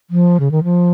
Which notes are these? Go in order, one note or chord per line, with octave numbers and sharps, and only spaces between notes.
F3
C#3
D#3
F3